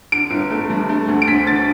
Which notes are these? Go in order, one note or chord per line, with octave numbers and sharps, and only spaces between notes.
D3 D7
G1
A3
G2
A3
D2
D7
D2 B6
D3 A6